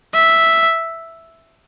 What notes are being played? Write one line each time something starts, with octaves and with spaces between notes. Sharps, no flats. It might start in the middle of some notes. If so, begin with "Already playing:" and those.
E5